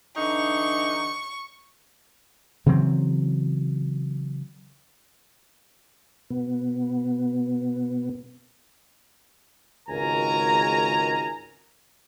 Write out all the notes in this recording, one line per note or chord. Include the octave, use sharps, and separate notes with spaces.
D3 E3 D#4 C#6
C#3 E3 F#3 C4
B2 B3
G#1 C#2 F#4 A#4 G#5 A#5